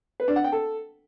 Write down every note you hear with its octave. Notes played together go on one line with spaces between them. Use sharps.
B4
D4
F#5
G5
A4